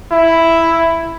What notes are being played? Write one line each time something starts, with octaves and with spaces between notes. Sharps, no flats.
E4